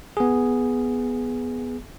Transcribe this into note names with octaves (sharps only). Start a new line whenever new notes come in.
B3 G#4